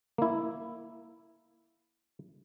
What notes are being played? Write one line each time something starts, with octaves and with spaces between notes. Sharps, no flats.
A#3 E4